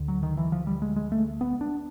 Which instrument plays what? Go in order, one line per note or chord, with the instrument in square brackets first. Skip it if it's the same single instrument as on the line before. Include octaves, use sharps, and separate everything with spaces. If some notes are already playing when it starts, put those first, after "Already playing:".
Already playing: [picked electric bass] D2 D3
F#3
D#3
E3
F3
G3
G#3
G#3
A3
B3
D4